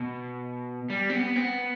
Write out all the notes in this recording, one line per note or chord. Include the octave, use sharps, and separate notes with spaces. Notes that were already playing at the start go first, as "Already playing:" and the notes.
Already playing: B2
G3
C4
B3
C4
B3